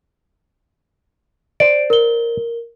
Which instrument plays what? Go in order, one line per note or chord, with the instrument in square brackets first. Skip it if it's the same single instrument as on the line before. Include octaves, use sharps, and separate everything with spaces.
[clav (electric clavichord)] C5 D5 [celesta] D7
[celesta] A#4 G7